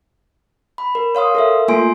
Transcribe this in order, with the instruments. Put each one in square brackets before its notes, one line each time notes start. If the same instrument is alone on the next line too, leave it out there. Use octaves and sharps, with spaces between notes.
[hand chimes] B5
A#4
C#5 F5 C6 D#6
A4 A#4 E5
A3 A#3 F4 G#5 C6 D7